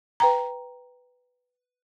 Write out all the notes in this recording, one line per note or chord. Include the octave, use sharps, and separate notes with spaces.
B4 G5 A#5